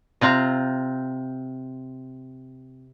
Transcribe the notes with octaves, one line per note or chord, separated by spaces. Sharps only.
C3 C4 F4 A#5